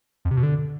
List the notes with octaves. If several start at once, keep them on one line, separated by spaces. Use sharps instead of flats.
F2
C3
B2
D3